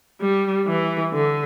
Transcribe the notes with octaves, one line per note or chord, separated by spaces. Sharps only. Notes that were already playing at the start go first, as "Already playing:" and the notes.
G3
E3
D3